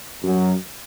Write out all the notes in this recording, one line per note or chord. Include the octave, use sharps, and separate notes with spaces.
F#2 F#3